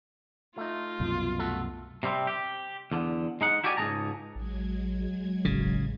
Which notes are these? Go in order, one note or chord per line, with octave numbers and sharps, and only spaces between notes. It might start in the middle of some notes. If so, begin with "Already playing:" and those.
A3 D#4 F4
C2 F#2 B2
A3 F#4 A4
C3 G3 C4
G4
E2 D3
G#3 D#4 F#5
E4 F#4 G4 A4 D5 G#5
C#2 G#2 G#3 G#4 A5 A#5
A1 F#3 G#3 G#6
E1 A1 C#3